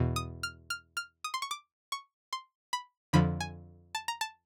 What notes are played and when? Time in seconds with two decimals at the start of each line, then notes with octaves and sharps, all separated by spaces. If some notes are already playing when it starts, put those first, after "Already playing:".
Already playing: E2 B2
0.16 D#6
0.43 F6
0.70 F6
0.97 F6
1.24 D#6
1.34 C6
1.42 C#6
1.51 D6
1.92 C#6
2.33 C6
2.73 B5
3.13 F2 D3 F3 B5
3.40 G#5
3.95 A5
4.08 A#5
4.21 A5